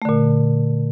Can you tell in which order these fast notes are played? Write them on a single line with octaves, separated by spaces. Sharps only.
A3 D3 A#2